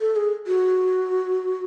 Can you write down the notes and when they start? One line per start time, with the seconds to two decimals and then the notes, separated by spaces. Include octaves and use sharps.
0.01 A4
0.16 G#4
0.47 F#4